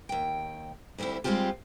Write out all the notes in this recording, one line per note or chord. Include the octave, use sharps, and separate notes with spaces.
D#2 G5
D2 D3 G3 C4 E4
G3 G#3 A#3 C4 F4 G4